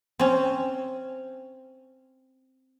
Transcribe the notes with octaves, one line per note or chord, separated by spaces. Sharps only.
C4 C#4